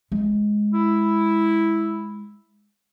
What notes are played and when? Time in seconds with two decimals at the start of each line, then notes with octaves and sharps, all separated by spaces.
0.12 G#3
0.74 E4